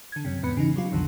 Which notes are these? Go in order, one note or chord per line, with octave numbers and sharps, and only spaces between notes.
D3 G#6
F#2 C3
E2 G#2 B3 B5 C#7
C#3 E3 D#4
F#3 G3 F4
B1 F2 B2 D3 D#3 F3